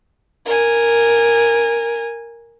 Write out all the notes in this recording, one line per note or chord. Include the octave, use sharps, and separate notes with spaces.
A#4 G#5